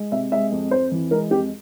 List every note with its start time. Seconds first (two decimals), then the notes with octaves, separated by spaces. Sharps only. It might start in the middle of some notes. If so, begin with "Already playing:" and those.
Already playing: G#3
0.12 C3 E5
0.32 G#3 E5
0.52 F2
0.71 F2 C5
0.91 E3
1.11 G#3 A#4
1.31 F2 G4